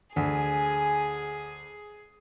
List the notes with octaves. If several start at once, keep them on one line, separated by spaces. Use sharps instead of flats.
D2 G#4 G#5